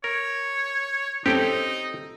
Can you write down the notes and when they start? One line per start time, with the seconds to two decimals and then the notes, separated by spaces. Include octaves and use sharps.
0.04 A#4 C#5
1.26 C4 D#4 G4 A4 C#5 G5